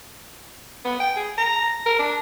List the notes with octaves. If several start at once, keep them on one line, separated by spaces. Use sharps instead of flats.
B3
G5
G#4
A#5
A#4
D4